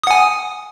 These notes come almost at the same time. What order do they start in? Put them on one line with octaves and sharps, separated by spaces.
D#6 F#5 G#5